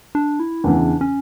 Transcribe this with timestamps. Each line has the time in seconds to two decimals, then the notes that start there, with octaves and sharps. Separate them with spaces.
0.15 D4
0.40 E4
0.64 E2 C#3 E3 D4
1.01 C#4